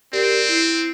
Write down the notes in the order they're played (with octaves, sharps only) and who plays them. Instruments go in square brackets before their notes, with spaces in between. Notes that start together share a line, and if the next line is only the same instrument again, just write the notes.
[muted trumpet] C4 [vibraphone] G4 A#4 D5
[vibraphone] E4